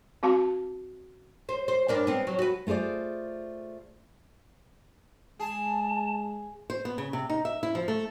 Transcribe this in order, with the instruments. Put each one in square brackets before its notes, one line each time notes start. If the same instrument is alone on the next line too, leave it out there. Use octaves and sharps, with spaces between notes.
[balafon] C4 F#4 F5 A5
[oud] C5
C5
G2 D4 A#4
B3 C4
F#3
F#4 B4
[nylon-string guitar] A3 F4 G#4 C5 D5
[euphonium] G#3 [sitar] G#4 [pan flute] A5
[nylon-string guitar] C5
B3
C#3
C3
D#4
E5
E4
F3
A3